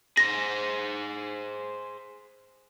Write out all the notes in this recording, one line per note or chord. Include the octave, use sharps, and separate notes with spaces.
G#4 C5 A#6